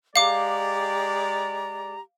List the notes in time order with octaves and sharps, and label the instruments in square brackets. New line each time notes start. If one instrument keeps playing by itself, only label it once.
[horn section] G#3 D5 [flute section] G4 A#5 [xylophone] F5 D6